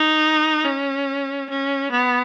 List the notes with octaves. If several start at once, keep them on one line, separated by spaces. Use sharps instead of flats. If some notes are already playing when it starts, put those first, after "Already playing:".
Already playing: D#4
C#4
C#4
B3